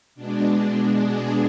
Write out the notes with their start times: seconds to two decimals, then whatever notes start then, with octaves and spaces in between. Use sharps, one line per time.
0.15 B2 G#3 D4
0.91 G#4